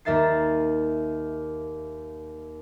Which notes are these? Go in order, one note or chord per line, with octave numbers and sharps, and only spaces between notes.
D#2 A#4 E5 A6 C7